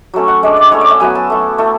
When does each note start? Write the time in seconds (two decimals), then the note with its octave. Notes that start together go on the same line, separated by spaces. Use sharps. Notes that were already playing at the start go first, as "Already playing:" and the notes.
0.14 F#3 A3 C#4
0.28 F#5
0.43 G#3 D4 E5
0.57 D5
0.71 A3 C#4 E4 C#5
0.81 D5
0.91 E5
1.00 F#3 B3 E4 G#5
1.15 A5
1.30 A3 E4
1.58 A3 E4